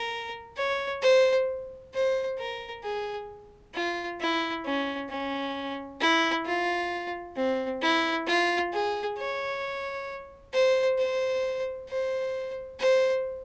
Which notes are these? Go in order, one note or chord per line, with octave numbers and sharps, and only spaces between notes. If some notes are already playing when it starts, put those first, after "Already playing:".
Already playing: A#4
C#5
C5
C5
A#4
G#4
F4
E4
C#4
C#4
E4
F4
C4
E4
F4
G#4
C#5
C5
C5
C5
C5